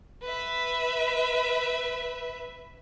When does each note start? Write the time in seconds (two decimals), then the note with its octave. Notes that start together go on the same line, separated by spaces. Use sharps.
0.22 B4 E5